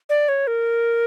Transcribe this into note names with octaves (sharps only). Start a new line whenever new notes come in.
D5
C#5
A#4